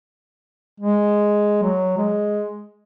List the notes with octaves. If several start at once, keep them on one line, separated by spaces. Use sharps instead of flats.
G#3
F#3
G#3